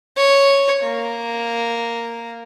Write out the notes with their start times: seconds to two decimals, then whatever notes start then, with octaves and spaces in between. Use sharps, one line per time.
0.17 C#5
0.83 A#3